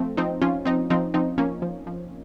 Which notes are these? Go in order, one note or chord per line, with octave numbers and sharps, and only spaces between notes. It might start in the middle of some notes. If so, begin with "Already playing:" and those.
Already playing: F3 A3 C4
F3 C4 D#4
F3 C#4 F4
F3 C4 D#4
F3 C4 D#4
F3 C4 D#4
F3 A#3 C#4
F3
F3